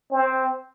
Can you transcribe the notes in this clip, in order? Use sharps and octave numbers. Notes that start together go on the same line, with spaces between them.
C4